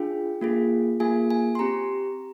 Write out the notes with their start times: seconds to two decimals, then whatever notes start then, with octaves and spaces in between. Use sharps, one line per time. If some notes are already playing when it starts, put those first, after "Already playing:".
Already playing: D4 F4 G#4 G5
0.41 A#3 F4 G#4
1.00 A#3 F4 G#4 G#5
1.30 G#5
1.55 C6
1.59 C4 G4 A#5